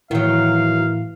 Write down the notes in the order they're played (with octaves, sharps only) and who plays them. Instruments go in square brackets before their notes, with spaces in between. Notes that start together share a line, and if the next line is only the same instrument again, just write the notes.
[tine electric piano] A2 [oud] D#3 F#3 [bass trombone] E3 [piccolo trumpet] F5